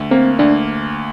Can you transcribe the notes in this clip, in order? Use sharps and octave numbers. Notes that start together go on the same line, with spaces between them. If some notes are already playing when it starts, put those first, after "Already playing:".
Already playing: D2
A#3 C4
D2 D4